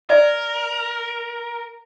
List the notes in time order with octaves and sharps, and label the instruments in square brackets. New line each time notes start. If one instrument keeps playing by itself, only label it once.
[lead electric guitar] A#4 [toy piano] D5